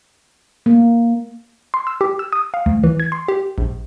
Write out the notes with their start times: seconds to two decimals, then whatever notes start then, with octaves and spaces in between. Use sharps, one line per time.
0.66 A#3
1.74 C6
1.87 E6
2.01 G4
2.19 E6
2.33 D#6
2.54 F5
2.66 D2
2.84 E3
3.00 G#6
3.12 C6
3.28 G4
3.58 A#1